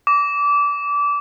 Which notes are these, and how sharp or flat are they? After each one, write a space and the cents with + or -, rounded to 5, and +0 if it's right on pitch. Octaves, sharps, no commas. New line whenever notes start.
D6 -25